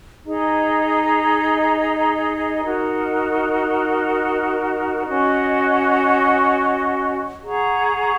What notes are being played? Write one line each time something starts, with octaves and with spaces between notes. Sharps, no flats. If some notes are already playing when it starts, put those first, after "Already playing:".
D#4 G#4 D#5 A#5
D#4 F#4 A#4
C#4 F#4 D#5
G#4 F#5 A#5 C#6